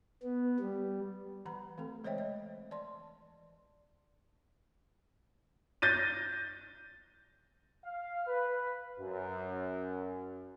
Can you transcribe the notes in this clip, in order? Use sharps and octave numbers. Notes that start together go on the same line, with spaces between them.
B3
G3
E3 B4 F#5 A#5 B5
E3 A3 C4 A4
G#3 C5 C#5 D#5 E5 G5
D#5
E3 D5 A5 C6
G6 A6 A#6 D#7
F5
B4
F#2